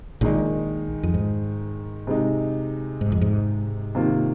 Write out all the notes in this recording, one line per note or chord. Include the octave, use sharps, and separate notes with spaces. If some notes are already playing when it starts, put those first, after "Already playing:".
A#1 A#2 D#3 G#3 D#4
F2
G#2
C3 G#3 D#4
G#2
F2
G#2
C3 D#3 A#3 F4